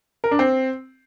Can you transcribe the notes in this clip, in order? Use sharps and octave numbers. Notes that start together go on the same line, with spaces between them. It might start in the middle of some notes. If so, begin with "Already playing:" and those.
A#4
D4
C4